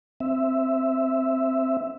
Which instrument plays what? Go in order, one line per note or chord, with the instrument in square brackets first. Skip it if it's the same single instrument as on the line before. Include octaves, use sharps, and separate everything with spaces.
[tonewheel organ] C4 E5